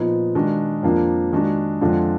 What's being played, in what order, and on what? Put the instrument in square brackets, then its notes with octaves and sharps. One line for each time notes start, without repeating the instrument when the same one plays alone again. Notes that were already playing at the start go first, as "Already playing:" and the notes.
Already playing: [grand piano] A#2 F3 B3 D#4
D#3 G#3 D4 F#4
F2 F3 A#3 D4
D#3 G#3 D4 F#4
F2 D3 G#3 D4 F4